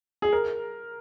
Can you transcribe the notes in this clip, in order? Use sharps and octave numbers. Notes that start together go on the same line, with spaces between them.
G#4
A#4